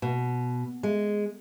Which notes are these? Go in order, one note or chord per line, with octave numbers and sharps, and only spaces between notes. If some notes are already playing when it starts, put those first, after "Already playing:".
B2
G#3